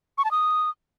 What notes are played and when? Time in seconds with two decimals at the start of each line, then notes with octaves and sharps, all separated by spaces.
0.18 C#6
0.25 A5
0.31 D#6